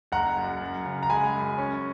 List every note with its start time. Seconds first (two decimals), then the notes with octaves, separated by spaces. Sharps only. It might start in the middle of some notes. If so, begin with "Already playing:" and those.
0.12 F#1 F#5 A#5
0.37 F#2
0.61 F#2
0.86 C#3
1.03 A#5
1.10 G#3 G#5 B5
1.34 F#2
1.58 C#4